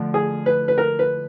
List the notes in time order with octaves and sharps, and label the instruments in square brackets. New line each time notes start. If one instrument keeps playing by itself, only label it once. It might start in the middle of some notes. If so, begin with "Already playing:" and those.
Already playing: [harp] F2 D3 F3 A3 D4
[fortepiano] G#4
B4
B4
A#4
B4